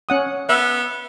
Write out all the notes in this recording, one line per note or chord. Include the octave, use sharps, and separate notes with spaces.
C#4 F#5 D#6
B3 E5